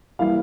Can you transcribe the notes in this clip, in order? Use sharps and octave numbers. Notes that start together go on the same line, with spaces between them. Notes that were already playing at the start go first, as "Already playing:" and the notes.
E3 G3 A#3 E4 F5